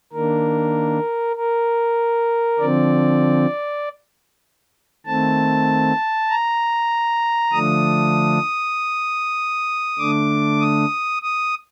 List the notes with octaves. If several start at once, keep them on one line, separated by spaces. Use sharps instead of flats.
D#3 A#3 D4 A#4
A#4
D3 F3 C4 D5
D#3 A3 C4 A5
A#5
D3 F3 A3 D4 D#6
D3 A3 D4 D6
D#6
D#6